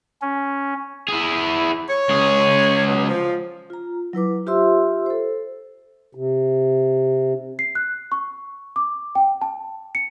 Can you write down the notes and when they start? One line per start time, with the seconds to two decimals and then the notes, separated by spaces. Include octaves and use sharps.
0.22 C#4
1.08 E4 G#4
1.89 C#5
2.10 C#2 G#4
2.87 B2 F#3
3.08 F3
3.70 F4 A#5
4.13 F#3 E4 B4 D6
4.47 F4 G4 C5 E5 C6 E6
5.06 A4 C5
6.15 C3
7.59 C7
7.75 F#6
8.12 C#6
8.76 D6
9.15 G5
9.41 A5
9.95 C#7